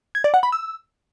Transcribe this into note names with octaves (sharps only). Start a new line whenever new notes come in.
G#6
D5
F#5
B5
E6